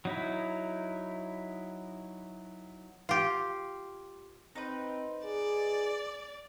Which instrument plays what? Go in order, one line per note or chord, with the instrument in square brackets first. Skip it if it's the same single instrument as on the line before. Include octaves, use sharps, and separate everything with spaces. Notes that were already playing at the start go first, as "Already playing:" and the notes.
[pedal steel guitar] F#3 D#4 E4
[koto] F4 G4
[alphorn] C4 [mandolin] D#4 B4
[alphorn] G#4 [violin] D5